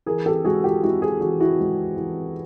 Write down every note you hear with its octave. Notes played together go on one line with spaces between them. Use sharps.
E3 G#4 A#4
G4 A4
G#3 F#4 G#4
F4 G4
G#3 E4 F#4
F#4 G#4
E3 F#4 G#4
E4 F#4
G#3
E3